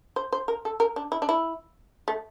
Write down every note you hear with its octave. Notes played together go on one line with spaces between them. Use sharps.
C5
C5
A#4
A4
A#4
D4
E4
D4
E4
A3